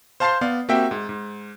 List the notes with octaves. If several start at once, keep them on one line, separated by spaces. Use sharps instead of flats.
C5 F5 A5 C6 G6 C7
B3 D5 F5
A#3 C4 F#4 G4 E5 G5
G#2
G#2